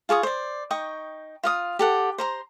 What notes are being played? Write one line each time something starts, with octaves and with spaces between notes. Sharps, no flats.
F4 G#4 C#6 D#6
C5 D5
D#4 G5 C#6 D#6
F4 F5 D#6
G4 A4 F#5
C5 A#5 C6